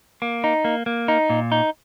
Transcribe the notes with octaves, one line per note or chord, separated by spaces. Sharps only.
A#3
D#4
A#3
A#3
D#4
A#2
D#4